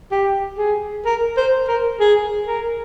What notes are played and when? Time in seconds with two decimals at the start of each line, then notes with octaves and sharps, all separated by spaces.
0.12 G4
0.58 G#4
1.05 A#4
1.37 C5
1.68 A#4
2.00 G#4
2.47 A#4